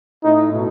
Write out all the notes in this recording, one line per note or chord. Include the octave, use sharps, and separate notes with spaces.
A2 D#4
A2
B2